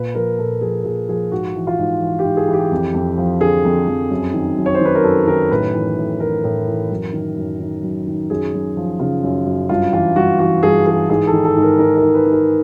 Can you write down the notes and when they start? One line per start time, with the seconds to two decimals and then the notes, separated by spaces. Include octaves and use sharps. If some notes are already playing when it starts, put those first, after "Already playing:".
Already playing: A#2 B4
0.15 F3 A#4
0.38 A#2 A4
0.61 F3 G#4
0.85 A#2 G#4
1.09 F3 G#4
1.32 G#2 F#4
1.56 E3
1.67 F4
1.79 G#2
2.01 E3
2.19 G4
2.24 G#2
2.37 G#4
2.48 E3
2.53 G4
2.71 F2
2.94 F2
3.18 F3
3.41 D3 G#4
3.65 F2
3.88 F2
4.11 F#2
4.34 D#3
4.58 F#2
4.66 C#5
4.75 C5
4.81 D#3 B4
4.95 A#4
5.04 F#2 A4
5.27 D#3 A#4
5.51 A2 B4
5.74 E3
5.98 A2
6.20 E3 A#4
6.44 A2
6.67 E3
6.91 F#2
7.13 D#3
7.37 F#2
7.60 D#3
7.83 F#2
8.07 D#3
8.30 F#2 G#4
8.54 F#2
8.77 F3
8.99 C#3 F4
9.24 F#2
9.46 F#2
9.69 G2 F4
9.93 E3 F4
10.16 G2 F#4
10.39 E3 F#4
10.63 G2 G#4
10.86 E3 G#4
11.09 G#2 G#4
11.27 A4
11.33 D#3
11.44 A4
11.56 G#2
11.62 A#4
11.79 D#3 A#4
11.97 A#4
12.02 G#2
12.15 B4
12.26 D#3
12.32 A#4